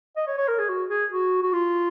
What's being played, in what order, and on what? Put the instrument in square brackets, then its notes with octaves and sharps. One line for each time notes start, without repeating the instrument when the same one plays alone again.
[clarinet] D#5
C#5
C#5
A#4
G#4
F#4
G#4
F#4
F#4
F4